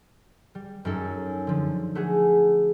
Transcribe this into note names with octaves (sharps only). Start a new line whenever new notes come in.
G3
F#2 C#4 D#4 A4
D3 F3
A3 F#4 G#4